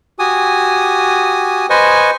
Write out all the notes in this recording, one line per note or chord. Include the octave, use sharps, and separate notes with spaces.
F#4 G4 G#5 D#6
B4 C5 D#5 G#5 C#6